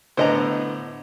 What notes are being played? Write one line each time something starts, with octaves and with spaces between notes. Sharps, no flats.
A2 D3 B3 C5 D#5 A#5